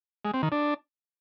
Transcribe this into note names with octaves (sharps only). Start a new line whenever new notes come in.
G#3
C4
D#3
D4